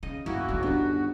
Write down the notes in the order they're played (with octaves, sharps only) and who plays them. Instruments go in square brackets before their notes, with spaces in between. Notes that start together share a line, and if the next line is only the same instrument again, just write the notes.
[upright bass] C#3 [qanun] D#5
[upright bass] G1 G2 [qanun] A#3 C#4 E4 [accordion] F#4
[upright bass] G#1 C#2 [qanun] D#3
[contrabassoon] G1 [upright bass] F#2 D3 [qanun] B3